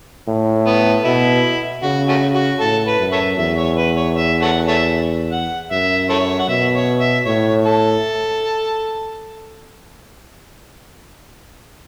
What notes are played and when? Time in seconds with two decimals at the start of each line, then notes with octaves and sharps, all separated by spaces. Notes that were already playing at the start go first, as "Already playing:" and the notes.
0.28 A2
0.66 B3
1.05 B2 E4
1.83 C#3 F#4
2.08 A3 C#4 F#4
2.35 F#4
2.60 A2 A4
2.87 B4
2.99 F#2
3.12 A4 C#5 E5
3.38 E2 E5
3.57 C#5
3.77 B4
3.96 C#5
4.16 E5
4.42 A4 C#5 F#5
4.68 A4 C#5 E5
5.32 F#5
5.71 F#2 E5
6.10 E4 A4 C#5
6.39 F#5
6.49 B2 E5
6.75 C#5
7.00 E5
7.26 A2 C#5
7.65 A4